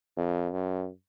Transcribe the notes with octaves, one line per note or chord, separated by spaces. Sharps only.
F2
F#2